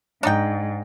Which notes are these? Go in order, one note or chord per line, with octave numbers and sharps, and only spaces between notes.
G#2 D4 D#4 G5